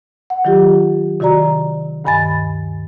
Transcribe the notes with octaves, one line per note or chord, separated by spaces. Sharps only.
F#5
D#3 F#3 F4 G4
C3 D#3 F#4 D5 A#5
D2 G2 D#3 G#5 B5 A6